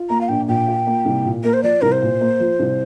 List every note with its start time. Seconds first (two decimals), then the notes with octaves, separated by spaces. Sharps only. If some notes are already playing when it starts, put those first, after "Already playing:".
Already playing: F4
0.09 A#3 A#5
0.21 F5
0.29 A#1 G5
0.48 A#2 G5
0.68 F4
0.87 A#3
1.05 C2
1.25 A#2
1.44 A#3 A#4
1.53 C5
1.63 F3 D5
1.82 C2 A#4
1.92 C5
2.02 A#2
2.21 A#3
2.40 F3
2.59 C2